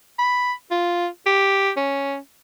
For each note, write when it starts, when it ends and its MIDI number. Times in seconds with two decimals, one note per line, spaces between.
0.19 0.52 83
0.71 1.07 65
1.27 1.71 67
1.77 2.17 61